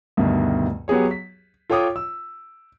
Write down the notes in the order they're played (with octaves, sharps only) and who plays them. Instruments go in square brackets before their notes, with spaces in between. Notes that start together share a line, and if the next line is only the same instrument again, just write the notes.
[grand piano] D2 G2 B2 D#3
F#3 B3 G4 G#4 C#5
B6
F4 A4 C#5 G5 D6 D#6
E6